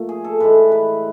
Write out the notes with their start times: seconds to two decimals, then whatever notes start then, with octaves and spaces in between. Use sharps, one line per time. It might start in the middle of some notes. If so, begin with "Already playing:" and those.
Already playing: A#2 F3 A3
0.09 G#4
0.24 A4
0.40 A2 E3 G#3 B4
0.72 B4